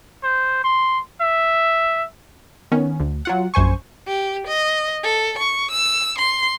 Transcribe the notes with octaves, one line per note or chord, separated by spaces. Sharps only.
C5
C6
E5
D#3 B3 C#4
D2
F#3 F4 F#5
A#1 F#2 C5 G#5 C#6
G4
D#5
A4
C#6
E6
C6